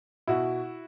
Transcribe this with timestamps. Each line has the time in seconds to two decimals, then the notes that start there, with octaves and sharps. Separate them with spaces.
0.27 B2 E4 F#4